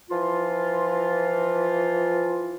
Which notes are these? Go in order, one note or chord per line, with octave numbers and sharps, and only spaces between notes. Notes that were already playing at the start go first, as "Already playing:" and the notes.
E3 F3 F4